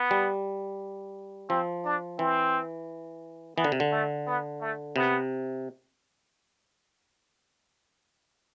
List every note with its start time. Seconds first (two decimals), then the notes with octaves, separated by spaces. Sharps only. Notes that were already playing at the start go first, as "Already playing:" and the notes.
Already playing: B3
0.11 G3
1.49 F3 C4
1.85 D4
2.19 E3 C4
3.57 E3 B3
3.64 D3
3.72 C3
3.80 D3
3.92 A3
4.27 B3
4.61 A3
4.96 C3 B3